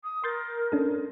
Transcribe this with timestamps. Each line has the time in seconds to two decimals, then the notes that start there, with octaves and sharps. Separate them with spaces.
0.04 D#6
0.24 A#4 C6 G6 A6
0.72 C#4 D4 A4